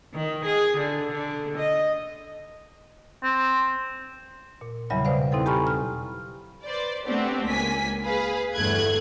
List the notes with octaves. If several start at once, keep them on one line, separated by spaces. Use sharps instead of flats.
D#3
G#4
D3
D3
D#5
C4
A#2
E2 C#3 F#3 G3 E5 B5
B2 C5 D5 F5
C4 D#4 E4 A4 G5
G4 G#5 A#5 B5 C#6 F6
F6
B4 C5 D5
A3 B3 C4 D4 F#4 G4
C#2 A#3 G#5 B6
G#4 B4 F5 B5
G1 E2 G2 A3 F#6 G#6